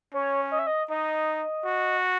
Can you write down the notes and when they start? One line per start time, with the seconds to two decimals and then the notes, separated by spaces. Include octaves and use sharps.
0.14 C#4 C#5
0.51 D#5
0.59 E5
0.67 D#5
0.90 D#4 D#5
1.65 F#4